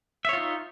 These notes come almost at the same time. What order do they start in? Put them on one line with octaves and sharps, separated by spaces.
E5 C#5 F4 D#4